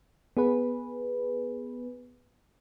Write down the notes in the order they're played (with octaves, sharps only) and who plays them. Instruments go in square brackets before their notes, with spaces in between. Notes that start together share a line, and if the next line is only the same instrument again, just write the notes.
[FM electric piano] B3 G#4 B4